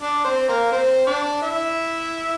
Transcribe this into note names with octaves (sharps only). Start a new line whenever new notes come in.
D4 D5
C4 C5
A#3 A#4
C4 C5
D4 D5
E4 E5